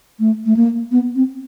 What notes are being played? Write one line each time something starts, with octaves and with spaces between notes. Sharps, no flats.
A3
A3
A#3
B3
C4